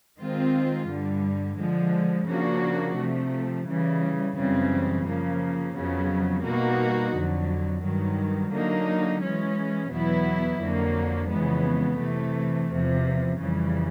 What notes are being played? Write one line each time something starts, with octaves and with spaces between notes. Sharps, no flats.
D#3 G#3 C4 F4
G2 D3 G3
D3 F3 G#3
C#3 F3 A#3 D4 F#4
C3 F3 A3
C#3 E3 G3
F#2 C#3 E3 G3 C4
C#3 F3 A#3
F2 C#3 F#3 B3
B2 G3 A#3 D#4 F#4
F2 D3 F#3
G2 D#3 F#3
D3 F#3 A#3 D#4
E3 G#3 C#4
E2 B2 F#3 B3 E4
F2 D3 F#3 A#3
F2 C#3 E3 G#3 B3
C3 E3 A3
E2 C3 F3
F2 C#3 E3 G3